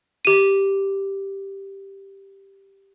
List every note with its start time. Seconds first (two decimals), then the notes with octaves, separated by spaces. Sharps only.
0.25 G4 D#7